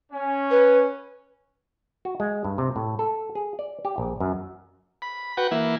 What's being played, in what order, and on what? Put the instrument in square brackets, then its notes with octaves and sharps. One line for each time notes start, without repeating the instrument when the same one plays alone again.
[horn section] C#4
[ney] B4
[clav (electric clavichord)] F#4
G#3
G2
C3
A2
A4
G#4
D5
G4
A#1
F#2
[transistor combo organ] B5
F#4 B4 F#5 G5
E3 A#3 E4